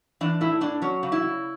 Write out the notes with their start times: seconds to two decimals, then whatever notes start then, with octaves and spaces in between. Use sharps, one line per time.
0.21 E3 D4
0.41 A2 E4
0.61 A2 D4
0.82 F#3 C#4
1.03 C#3
1.12 E4
1.22 C#3